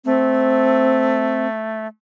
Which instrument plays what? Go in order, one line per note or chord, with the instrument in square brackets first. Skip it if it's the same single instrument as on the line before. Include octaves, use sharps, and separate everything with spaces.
[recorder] A3 [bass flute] C4